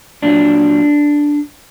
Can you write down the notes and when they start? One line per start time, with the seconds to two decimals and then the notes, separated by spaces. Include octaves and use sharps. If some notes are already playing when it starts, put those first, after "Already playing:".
0.22 A#2 F#3 D4